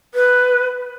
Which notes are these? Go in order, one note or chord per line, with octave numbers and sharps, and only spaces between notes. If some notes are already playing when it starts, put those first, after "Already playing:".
B4